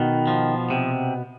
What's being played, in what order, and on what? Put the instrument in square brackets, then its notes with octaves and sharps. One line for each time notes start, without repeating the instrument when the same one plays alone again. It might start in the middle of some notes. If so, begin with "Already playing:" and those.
Already playing: [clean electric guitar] B2 D#3 B3
F3
C3